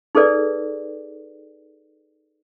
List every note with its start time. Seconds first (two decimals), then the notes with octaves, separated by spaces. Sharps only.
0.15 D#4 G#4 A4 B4 D5